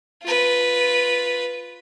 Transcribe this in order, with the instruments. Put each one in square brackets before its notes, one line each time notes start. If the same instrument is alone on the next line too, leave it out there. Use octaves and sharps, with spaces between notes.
[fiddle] F4 B4